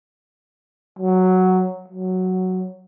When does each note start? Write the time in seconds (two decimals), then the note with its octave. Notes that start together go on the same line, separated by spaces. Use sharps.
0.99 F#3
1.88 F#3